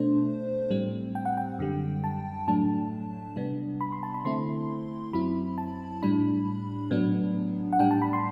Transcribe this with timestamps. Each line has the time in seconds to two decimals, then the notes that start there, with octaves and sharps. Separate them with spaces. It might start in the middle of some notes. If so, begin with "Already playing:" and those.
Already playing: B2 A3 D4 C5
0.71 A2 G3 C4
1.15 G5
1.25 F#5
1.37 G5
1.59 F#2 D3 G3
2.04 A5
2.48 A2 F#3 A3 D4 A5
3.36 C3 G3 B3 D4
3.81 B5
3.92 C6
4.03 A5
4.14 B5
4.24 D3 A3 C4 E4 C6
5.13 F#2 F#3 C4 E4 B5
5.58 A5
6.02 A2 G3 D4 B5
6.91 A2 F#3 B3 D4
7.73 F#5
7.79 A2 G3 D4 G5
7.91 A5
8.02 B5
8.13 C6